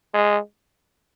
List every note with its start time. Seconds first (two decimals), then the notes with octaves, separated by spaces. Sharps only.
0.14 G#3